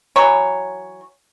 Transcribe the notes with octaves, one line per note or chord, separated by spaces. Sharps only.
E3 F#3 C#5